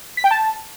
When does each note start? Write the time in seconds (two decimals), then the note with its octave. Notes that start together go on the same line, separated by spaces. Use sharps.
0.17 B6
0.24 G5
0.31 A5